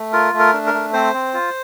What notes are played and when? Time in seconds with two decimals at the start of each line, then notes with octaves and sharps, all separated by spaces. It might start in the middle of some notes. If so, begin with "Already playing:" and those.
Already playing: A3
0.13 F4 A#4
0.33 A3
0.39 A#4
0.53 D4
0.67 A#4
0.74 A3
0.93 C4 C5
1.14 C4
1.34 F4